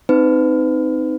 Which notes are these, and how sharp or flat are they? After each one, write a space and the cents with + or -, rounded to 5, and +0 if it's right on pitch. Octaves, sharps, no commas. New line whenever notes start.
C4 -15 D#4 +0 B4 +35